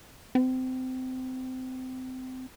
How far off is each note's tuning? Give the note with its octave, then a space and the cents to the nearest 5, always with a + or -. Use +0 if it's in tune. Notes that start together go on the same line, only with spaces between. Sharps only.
C4 -25